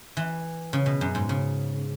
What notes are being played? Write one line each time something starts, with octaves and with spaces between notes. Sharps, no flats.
E3
C#3
B2
F#2
G#2
C#3